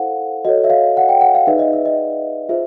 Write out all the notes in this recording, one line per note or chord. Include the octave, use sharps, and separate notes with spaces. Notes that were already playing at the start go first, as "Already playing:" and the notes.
Already playing: E4 A4 C5 F5 F#5
F#4 A4 C#5 D#5
E5
F5
F#5
G5
F#5
F5
D#4 G#4 B4 D5 E5
D#5
E5
D#5
F4 G#4 C5 E5